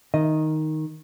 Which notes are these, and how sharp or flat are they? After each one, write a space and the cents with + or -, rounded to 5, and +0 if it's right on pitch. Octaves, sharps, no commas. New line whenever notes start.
D#3 +0 D#5 +0